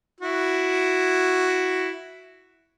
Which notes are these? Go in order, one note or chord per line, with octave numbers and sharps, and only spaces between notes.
E4 F#4